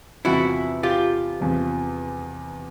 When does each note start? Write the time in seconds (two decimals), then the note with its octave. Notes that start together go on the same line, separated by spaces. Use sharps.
0.25 E2 C3 F3 E4 F#4
0.83 F4 G4
1.40 E2 C3 F3